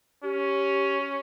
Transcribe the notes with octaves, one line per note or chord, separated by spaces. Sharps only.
C#4 G4